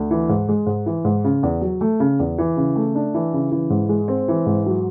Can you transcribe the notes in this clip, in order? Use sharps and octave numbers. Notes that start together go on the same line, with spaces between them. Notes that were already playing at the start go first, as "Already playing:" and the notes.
Already playing: D2
E3
G#2
G#3
G#2
E3
G#2
C#3
E2
F#3
A3
C#3
E2
E3
C#3
A3
D4
E3
C#3
E3
G#2
G#3
C4
E3
G#2
F#3